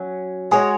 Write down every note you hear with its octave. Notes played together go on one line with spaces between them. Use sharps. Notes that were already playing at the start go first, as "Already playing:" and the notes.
Already playing: F#3 C#4
G#3 F#4 G#4 C#5